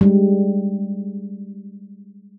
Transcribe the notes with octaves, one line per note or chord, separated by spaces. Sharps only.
G3 G#3